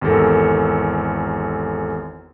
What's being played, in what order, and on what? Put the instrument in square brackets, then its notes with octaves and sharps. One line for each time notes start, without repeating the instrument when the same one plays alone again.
[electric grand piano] G#1 E2 G4 A4 A#4